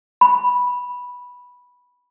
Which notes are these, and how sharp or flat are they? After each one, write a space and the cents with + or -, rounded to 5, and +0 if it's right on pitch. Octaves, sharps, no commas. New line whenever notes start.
B5 -10